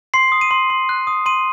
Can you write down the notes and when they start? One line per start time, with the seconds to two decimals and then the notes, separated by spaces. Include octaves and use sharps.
0.14 C6 C7
0.32 D#6
0.41 D#7
0.51 C6
0.70 C6
0.89 F#6
1.07 D#6
1.26 C6 D#7